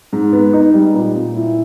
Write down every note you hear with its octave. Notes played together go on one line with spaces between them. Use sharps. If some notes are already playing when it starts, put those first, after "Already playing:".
G#2
B3
D#4
G3
A#2
A#2
E4